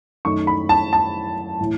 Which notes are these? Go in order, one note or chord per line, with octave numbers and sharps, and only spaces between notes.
F#2 D#3 A3 D#4 C#6
B5
A5
A5
A2 E3